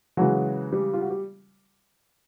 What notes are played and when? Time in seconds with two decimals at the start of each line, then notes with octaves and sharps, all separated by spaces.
0.17 C#3 E3 F#3 G#3 F#4
0.72 G3 G4
0.94 F4
1.01 F#4
1.10 G4